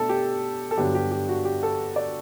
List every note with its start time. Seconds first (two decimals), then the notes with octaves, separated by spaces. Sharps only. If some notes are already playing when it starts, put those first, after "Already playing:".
Already playing: B2 A3 D4 A4
0.09 G4
0.71 A4
0.77 G2 D3 F#3 B3 D4 G4
0.95 G4
1.11 G4
1.29 F#4
1.45 G4
1.63 A4
1.96 D5